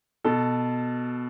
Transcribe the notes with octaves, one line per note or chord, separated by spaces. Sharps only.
B2 A4